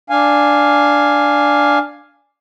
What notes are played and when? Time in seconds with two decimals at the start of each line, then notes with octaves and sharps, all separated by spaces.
0.10 D4 F5 G#5